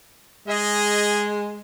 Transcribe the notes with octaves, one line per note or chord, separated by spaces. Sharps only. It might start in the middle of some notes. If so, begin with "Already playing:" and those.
G#3 G#4 D#5